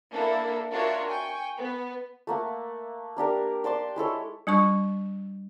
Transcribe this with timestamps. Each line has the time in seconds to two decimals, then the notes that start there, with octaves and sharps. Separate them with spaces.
0.13 A#3 D4 E4 A4
0.73 D4 F4 F#4 A#4 C#5 E5
1.10 G5 G#5 C#6
1.59 B3
2.27 A3 A#3 F#5
3.17 A#3 D4 G4 A#4
3.64 D5 A5 C6 D6
3.96 G#3 E4 A4 C#5
4.47 G3 D4 C#6